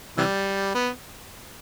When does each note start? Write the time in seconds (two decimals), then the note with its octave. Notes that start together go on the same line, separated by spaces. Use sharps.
0.17 C3 E3 G3
0.75 B3